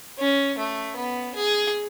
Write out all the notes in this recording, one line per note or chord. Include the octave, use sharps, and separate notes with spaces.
C#4
A3
B3
G#4